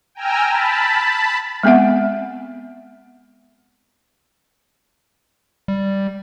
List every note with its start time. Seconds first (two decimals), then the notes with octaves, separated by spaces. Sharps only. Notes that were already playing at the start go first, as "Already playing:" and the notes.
0.15 G5 G#5 A#5 E6 F6
0.46 A5 B5
1.63 G#3 B3 C4 E5 F#5
5.68 G3